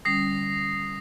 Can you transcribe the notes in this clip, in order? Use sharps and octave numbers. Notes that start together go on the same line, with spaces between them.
D3 G3 C#4 D#6 A#6 C7